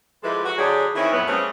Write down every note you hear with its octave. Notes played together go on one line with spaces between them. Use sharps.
F3 G#3 E4 G4 A4 B4
F#4
D3 F#3 D4 G4 G#4
D#3 E3 C4 C#4 E4
F2 A2 F#3 B3
G3 A3 A#3 C4 C#4 G#4